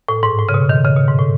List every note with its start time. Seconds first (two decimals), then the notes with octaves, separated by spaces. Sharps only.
0.09 A2
0.23 G#2
0.39 A2
0.49 C#3
0.54 B2
0.69 D#3
0.85 C#3
0.96 B2
1.08 G#2
1.18 A2